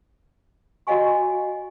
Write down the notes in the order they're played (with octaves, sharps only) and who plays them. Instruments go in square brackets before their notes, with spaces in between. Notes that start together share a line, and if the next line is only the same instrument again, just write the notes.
[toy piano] F#4 C#5 D#5 F5 G#5 C#6